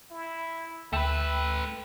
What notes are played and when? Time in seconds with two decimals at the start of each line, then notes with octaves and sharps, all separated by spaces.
0.11 E4
0.93 D2 A3 B4 E5 G5 E6